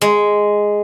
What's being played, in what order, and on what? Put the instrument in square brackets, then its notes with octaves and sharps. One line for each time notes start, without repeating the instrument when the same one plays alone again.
[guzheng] G#3